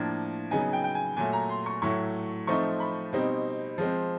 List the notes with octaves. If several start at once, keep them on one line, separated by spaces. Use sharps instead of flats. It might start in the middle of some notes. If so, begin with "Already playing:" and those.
Already playing: A2 F3 A#3 D4
C#3 F#3 B3 D#4 G#5
G5
G5
G#5
A#2 F#3 A3 G#5
A#5
C6
C#6
A2 F#3 A3 C#6
F3 A3 C4 D#4 C#6
B5
B2 G3 C4 D#4
F3 G#3 C4